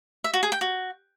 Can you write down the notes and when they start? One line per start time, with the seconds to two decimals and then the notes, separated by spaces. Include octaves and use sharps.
0.24 E5
0.34 F#4
0.43 G#4
0.52 G5
0.61 F#4